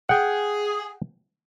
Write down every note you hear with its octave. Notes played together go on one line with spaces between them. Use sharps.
G#4 F#5 G5